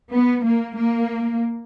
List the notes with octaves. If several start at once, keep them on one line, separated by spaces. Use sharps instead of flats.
B3
A#3
A#3